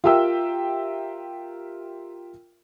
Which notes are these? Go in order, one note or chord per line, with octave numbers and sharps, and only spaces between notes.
F4 G4 A#4 E5 G5 E6